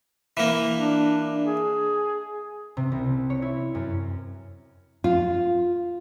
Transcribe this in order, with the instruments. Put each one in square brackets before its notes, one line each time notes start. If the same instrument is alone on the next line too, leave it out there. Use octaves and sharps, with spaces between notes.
[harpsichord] E3 A#3
[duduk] D4
G#4
[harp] C3
C2
C#5
E4
F#2
[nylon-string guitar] F4